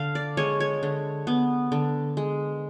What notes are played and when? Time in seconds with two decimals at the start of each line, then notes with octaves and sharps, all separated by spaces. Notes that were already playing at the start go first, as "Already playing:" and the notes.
Already playing: D3 F5
0.15 D5
0.37 G#3 C#5
0.60 C#5
0.83 D3
1.27 B3
1.72 D3
2.17 G#3